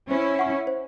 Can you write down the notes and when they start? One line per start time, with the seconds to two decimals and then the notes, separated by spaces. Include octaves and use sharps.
0.11 C#4 E4 C5
0.39 F#5 C#6
0.67 C5